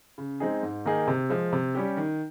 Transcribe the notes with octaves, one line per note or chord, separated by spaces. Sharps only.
C#3
G#3 C4 D#4 G#4
G#2
D#3 A#3 D#4 G#4
C3
F3 G#3
C3
G3 C#4 G4
D#3